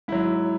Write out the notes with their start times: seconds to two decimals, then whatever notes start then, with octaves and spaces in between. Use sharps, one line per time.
0.08 G#2 F#3 E4